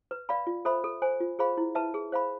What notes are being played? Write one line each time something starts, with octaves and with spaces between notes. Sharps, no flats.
B4
D5 F5 B5
F4
A4 C5 E5 B5
A4
C5 G#5
F4
G#4 C5 F5 B5
E4
B4 E5 A5
G#4
C5 F5 B5